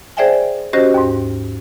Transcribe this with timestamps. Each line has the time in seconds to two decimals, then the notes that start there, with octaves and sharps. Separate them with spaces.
0.17 G#4 C5 D5 E5 G5 G#5
0.73 C#4 F#4 G4 C5 D#5 A#6
0.94 D#2 G#2